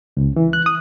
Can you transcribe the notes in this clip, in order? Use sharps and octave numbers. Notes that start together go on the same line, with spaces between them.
C#2
E3
F#6
D#6